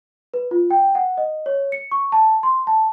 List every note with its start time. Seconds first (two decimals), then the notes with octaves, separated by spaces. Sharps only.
0.34 B4
0.51 F4
0.71 G5
0.95 F#5
1.17 D#5
1.46 C#5
1.72 C#7
1.92 C#6
2.12 A5
2.43 C6
2.67 A5